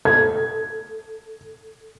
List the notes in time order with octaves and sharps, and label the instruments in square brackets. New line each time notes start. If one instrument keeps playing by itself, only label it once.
[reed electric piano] A4 [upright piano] G#6